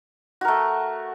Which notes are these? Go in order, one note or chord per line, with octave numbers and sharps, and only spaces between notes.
A3 F#4 A#4